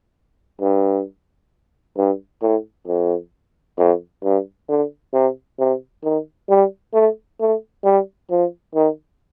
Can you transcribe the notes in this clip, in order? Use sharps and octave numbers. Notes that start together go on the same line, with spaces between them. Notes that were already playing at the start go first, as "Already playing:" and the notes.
G2
G2
A2
F2
F2
G2
D3
C3
C3
D#3
G3
A3
A3
G3
F3
D#3